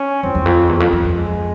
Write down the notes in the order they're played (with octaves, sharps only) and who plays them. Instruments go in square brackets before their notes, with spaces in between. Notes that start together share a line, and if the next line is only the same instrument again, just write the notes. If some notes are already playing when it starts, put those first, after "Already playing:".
Already playing: [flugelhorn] C#4
[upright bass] F2 [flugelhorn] C4
[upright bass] E2
F2
E2
F2
F2
F2
[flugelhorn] G#3